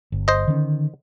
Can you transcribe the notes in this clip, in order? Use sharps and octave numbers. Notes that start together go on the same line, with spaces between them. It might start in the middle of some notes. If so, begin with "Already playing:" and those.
G1
C5 D#5
D3 D#3 C#4